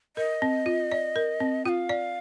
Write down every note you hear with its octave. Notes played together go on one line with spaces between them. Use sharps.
A#4 D#5
C4
F4
D5
A#4
C4
F4 F5 G5
D5